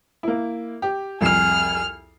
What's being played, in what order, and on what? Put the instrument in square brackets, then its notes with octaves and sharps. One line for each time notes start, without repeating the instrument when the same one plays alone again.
[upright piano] A#3 E4
G4
[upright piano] C2 F2 C7 [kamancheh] G#4 F6